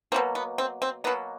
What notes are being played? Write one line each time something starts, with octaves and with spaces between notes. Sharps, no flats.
B2 F#3 A#3 C4
B3
C4
C4
B2 F#3 A#3 B3